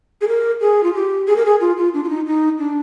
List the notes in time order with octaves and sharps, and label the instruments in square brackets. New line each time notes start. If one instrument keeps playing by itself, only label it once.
[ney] G#4
A#4
G#4
F4
G4
G#4
A#4
G#4
F4
F4
D4
F4
D#4
D#4
D4